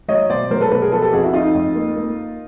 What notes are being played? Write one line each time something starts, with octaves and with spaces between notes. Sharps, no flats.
F#3 C#5 D#5
B2 C5 D5
F#3 A#4 C5
A4 B4
B2 A4 B4
G#4 A#4
F3 A4 B4
G4 A4
F2 F#4 G#4
E4 F#4
F2 D#4 F4
F2
A#3
A#3